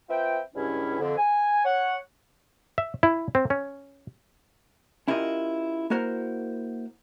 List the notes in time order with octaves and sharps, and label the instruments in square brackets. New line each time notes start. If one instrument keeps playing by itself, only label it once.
[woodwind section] C4 F4 B4 E5 G5
C#2 G2 C#4 E4
F2 D3
G#5
C#5 F#5
[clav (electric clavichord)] E5
E4
C4
C#4
[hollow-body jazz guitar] C#4 E4 F4 G4 A#4 D#5
A#3 E4 F#4 A#4 C5